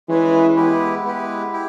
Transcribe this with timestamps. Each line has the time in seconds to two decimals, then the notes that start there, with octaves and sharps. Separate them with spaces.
0.08 E3 G#3 C#4 G#4 B4
0.56 G#3 B3 E4 G4 B4
1.04 G#3 B3 E4 G4 B4
1.53 E4 G4